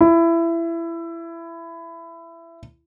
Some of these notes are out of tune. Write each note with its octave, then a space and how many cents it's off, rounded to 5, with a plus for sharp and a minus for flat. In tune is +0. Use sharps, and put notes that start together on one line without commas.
E4 +20